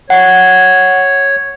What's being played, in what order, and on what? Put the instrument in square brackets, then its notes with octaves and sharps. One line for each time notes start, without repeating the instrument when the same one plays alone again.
[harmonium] C#5 [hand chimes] F#5